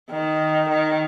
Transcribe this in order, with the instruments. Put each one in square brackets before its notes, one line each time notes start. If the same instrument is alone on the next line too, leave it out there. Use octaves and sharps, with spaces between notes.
[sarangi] D#3
D#3